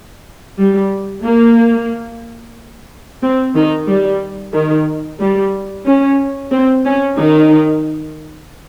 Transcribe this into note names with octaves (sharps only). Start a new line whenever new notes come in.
G3
A#3
C4
D#3 D#4
G3
D#3
G3
C#4
C4
C#4
D#3 D#4